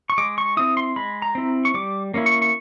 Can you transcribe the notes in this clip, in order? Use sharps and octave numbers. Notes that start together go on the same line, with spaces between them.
C#6
G#3 D6
C#6
C4 E4 D#6
C6
G#3 B5
A#5
C4 E4
C#6
G3 D6
A#3 C#4 E4
C#6
C#6